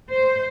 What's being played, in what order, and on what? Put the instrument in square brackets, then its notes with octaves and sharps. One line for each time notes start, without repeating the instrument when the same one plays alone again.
[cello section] C5